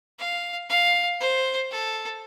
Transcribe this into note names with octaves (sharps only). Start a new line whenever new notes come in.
F5
F5
C5
A4